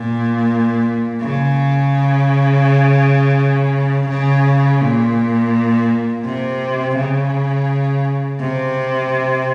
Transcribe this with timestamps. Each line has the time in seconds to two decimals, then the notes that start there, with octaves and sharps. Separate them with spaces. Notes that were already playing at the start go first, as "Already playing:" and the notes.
Already playing: A#2
1.22 C#3
4.09 C#3
4.81 A#2
6.25 C3
6.97 C#3
8.40 C3